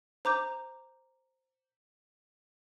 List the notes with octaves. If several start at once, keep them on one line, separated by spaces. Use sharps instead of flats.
C5 A#5 D6 G6